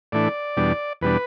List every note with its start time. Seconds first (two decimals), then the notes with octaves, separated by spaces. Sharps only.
0.12 A2 E3 A3 D4 D5
0.57 E2 B2 G3 D4
1.01 E2 B2 G3 D4 B4